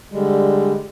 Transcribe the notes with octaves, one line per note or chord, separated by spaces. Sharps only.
D3 G3 G#3